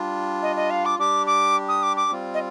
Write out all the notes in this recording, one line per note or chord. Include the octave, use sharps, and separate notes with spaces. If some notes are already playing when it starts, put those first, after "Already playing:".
Already playing: G3 D4 F4
D#5
D#5
F5
D6
G3 D4 G4 D6
D6
D#6
D6
D6
G3 C4 F4
D#5